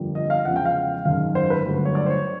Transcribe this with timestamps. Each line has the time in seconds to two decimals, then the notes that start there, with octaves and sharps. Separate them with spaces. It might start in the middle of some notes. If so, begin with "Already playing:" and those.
Already playing: G1 F2 D3 G3 A#3
0.15 D#5
0.30 F5
0.45 E2 C#3 F3 G#3 F#5
0.56 G5
0.65 F5
1.05 G#1 F#2 D#3 G#3 F5
1.35 C5
1.50 B4
1.66 G1 G2 D3 F#3 A3
1.85 C#5
1.95 D5
2.06 C5
2.10 C#5